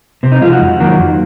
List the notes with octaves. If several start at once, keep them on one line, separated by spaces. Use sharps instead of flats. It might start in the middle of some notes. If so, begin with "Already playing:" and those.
C3 C4
D#4
F3 G#3 F4
F#4
F2
D#3 F#3 A#3
F2